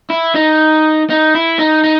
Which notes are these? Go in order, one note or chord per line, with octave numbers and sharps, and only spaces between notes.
E4
D#4
D#4
E4
D#4
D#4